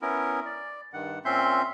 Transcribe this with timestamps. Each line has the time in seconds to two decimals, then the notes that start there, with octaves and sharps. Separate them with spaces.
0.02 B3 C#4 E4 A#4
0.46 D5
0.93 G2 D#3 F#5
1.25 A#2 C4 C#4 E5 C6 G6